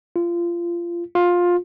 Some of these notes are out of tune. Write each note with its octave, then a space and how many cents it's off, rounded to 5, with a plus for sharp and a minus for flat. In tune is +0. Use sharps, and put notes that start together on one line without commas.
F4 -25
F4 +15